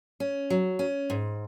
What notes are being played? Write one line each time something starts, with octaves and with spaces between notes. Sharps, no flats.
C#4
F#3
C#4
G#2